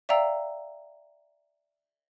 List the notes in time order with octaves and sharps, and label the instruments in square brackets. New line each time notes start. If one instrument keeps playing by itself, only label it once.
[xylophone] D5 E5 F5 G5 A#5 E6